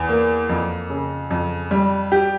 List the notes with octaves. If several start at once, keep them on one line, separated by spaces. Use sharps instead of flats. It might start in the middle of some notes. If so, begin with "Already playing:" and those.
Already playing: E2
A#3
F2
C#3
F2
G3
G4